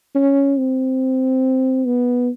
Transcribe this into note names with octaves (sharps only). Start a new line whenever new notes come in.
C#4
C4
B3